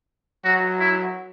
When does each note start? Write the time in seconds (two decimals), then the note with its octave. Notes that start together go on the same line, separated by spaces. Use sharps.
0.45 F#3 F#4
0.80 E4